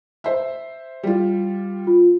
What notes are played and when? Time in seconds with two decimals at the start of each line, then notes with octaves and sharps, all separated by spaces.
0.24 C5 E5
1.03 G3 F4
1.87 F4